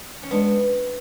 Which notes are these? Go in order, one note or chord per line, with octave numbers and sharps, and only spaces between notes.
C#4
G#3 B3 D4